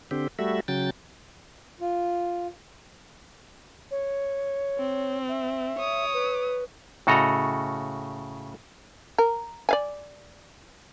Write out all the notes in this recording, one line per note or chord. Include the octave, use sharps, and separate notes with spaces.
D3 C4 G4
G3 A3 F#4 E5
C#3 F#3 G5 A6
F4
C#5
C4
E5
C#5 D#6
B4
A2 C#3 F#4 A4 D#5 A#5
A#4
D5 F5 G#5